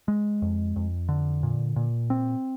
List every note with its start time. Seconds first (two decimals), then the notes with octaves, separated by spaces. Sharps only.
0.08 G#3
0.42 F2
0.76 F2
1.09 D3
1.43 A#2
1.76 A#2
2.10 C4